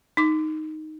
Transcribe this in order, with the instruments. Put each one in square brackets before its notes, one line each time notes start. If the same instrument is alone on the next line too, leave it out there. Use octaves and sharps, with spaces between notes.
[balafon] D#4 D6